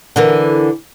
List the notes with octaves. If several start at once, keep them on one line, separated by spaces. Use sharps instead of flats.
D3 E3 A#4